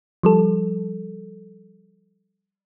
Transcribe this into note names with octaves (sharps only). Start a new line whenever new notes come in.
F3 G3 A4